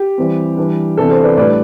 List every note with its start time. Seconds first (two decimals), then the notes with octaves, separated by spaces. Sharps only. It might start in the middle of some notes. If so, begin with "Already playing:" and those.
Already playing: G4
0.18 E3 G3 C4
0.57 E3 G3 D4
0.97 C3 E3 B3 D4 A4
1.10 A4 C5
1.24 B4 D5
1.37 A2 G3 D4 B4 D5